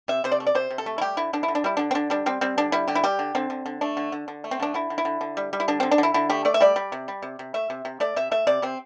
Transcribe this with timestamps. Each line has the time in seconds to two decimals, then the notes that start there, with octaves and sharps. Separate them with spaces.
0.08 C3 E5
0.24 C3 C5
0.32 D5
0.40 A3
0.47 D5
0.55 C3 C5
0.71 C3
0.78 A4
0.86 A3
0.98 E4
1.01 G3 G4
1.17 D3 E4
1.33 D3 D4
1.43 E4
1.48 D3
1.55 D4
1.64 G3 E4
1.77 D3 D4
1.91 C4
1.95 D3 D4
2.10 G3 D4
2.26 G3 C4
2.41 G3 C4
2.58 D3 D4
2.72 G3 E4
2.88 D3 G4
2.95 E4
3.04 G3 G4
3.19 D3
3.35 D3 C4
3.50 D3
3.66 D3
3.81 A3 D4
3.97 D3
4.12 D3
4.28 D3
4.44 A3
4.51 C4
4.60 D3 D4
4.74 D3 E4
4.90 D3
4.98 E4
5.05 D3
5.21 D3
5.37 G3
5.53 G3
5.60 E4
5.68 D3 D4
5.80 D3 C4
5.91 D4
5.98 D3 E4
6.14 D3 E4
6.30 A3 G4
6.45 A3 D5
6.54 E5
6.60 G3 D5
6.76 G3
6.92 C3
7.08 G3
7.22 C3
7.39 C3
7.54 A3 E5
7.70 C3
7.85 C3
8.00 A3 D5
8.16 C3 E5
8.31 A3 E5
8.47 C3 D5
8.62 C3 C4